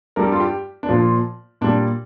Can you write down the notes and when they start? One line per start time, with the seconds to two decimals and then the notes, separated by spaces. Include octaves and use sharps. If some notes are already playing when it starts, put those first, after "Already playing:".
0.16 G2 G3 A#4
0.24 G4
0.32 F4
0.40 G4
0.83 D4
0.89 A#2 F3 F4
1.61 A#2 G3 D4